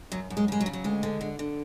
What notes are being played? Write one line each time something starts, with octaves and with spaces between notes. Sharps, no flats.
F#2 F#3
F#2
G#3
C#3 G#3
F#3
C#3
F#3
D2 G#3
D3
D3
D3